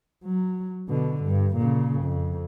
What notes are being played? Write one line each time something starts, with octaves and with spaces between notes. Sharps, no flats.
F#3
B2 D3
G2
A#2 C#3
F2